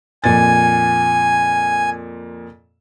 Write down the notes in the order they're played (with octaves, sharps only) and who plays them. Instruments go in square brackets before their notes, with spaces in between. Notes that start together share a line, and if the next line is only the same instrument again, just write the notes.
[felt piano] F2 A#2 A6 [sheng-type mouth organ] G#5